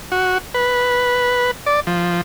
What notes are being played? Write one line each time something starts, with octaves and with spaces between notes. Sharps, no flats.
F#4
B4
D5
F3